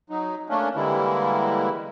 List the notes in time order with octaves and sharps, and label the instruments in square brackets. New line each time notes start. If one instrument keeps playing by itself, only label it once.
[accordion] F#3 D#4
A3 A#3 C#4 D4
D3 E3 G3 G#3 A#3 E4